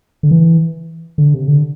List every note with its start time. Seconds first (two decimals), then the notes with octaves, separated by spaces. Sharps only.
0.23 D3
0.31 E3
1.18 D3
1.34 C3
1.48 D3